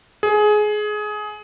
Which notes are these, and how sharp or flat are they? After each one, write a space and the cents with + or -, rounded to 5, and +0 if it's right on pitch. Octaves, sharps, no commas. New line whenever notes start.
G#4 +20